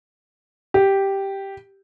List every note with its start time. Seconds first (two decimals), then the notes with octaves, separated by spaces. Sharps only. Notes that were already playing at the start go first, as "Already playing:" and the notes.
0.74 G4